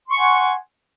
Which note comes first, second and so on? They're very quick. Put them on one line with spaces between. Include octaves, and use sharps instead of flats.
C6 C#6 G#5 F#5